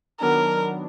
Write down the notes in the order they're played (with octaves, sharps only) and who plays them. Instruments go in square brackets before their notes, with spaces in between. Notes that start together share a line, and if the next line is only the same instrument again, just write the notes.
[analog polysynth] D#3 F#3 B3 D4 [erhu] A#4